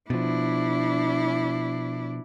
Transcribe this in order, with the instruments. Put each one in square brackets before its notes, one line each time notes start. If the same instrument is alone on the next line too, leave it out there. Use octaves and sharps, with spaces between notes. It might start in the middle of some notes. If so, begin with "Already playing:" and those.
[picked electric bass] B2 F3 [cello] D4 E4